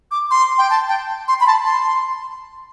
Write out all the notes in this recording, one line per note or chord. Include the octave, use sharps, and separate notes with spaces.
D6
C6
G5
A5
G5
C6
B5
A5
C6